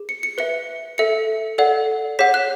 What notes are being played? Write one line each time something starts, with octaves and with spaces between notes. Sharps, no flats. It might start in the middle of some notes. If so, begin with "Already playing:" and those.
Already playing: G#4
C#7
C#7
B4 E5 C#7
A4 E5 C#7
A4 D5 F#5
G#4 C#5 F#5 B6
F#6